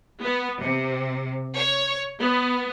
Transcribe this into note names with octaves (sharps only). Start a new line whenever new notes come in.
B3
C3
C#5
B3